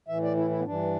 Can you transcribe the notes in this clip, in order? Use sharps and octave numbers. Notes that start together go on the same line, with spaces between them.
A2 E3 E5
D5
E4
E4
B3
G2 E3 D4